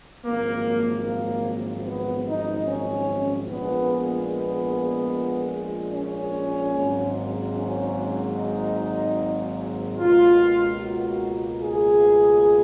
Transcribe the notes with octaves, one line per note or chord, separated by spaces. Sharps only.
G#1 F#2 F3 A#3
A#3
B3
D#4
C#4
A#1 A#2 G#3 B3
B3
C#4
G#1 G#2 F#3 A#3
C#4
D#4
C#2 B2 A#3 F4
F#4
G#4